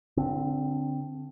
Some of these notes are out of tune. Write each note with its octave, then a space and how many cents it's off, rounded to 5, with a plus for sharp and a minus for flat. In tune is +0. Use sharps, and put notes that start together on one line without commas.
D3 -20 C4 +0